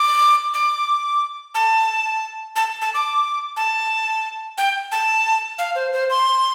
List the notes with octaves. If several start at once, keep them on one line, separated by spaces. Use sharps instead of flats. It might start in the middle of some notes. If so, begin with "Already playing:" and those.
Already playing: D6
D6
A5
A5
A5
D6
A5
G5
A5
F5
C5
C5
C6